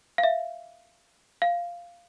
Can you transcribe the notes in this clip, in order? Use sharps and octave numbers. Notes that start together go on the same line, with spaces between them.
F5
E5
F5